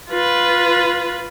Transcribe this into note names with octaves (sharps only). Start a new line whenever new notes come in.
F4 B4